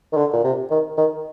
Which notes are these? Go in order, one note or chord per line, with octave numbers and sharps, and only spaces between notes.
D#3
D3
A#2
C3
D#3
D#3